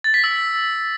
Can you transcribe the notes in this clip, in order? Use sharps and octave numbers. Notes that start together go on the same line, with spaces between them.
A6
B6
E6